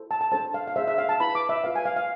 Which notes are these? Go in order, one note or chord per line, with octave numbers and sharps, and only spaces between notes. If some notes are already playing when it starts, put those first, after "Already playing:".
Already playing: E4 A4 C5
A5
A5
D4 A4 C5 A5
F5
F5
D4 G#4 C5 E5
E5
F5
A5
E4 B4 B5
D6
E5
F4 B4 F5
G#5
F5
F5